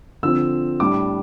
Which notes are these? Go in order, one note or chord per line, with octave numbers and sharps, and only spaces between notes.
D3 F3 C4 E6
A2 G3 D4 D6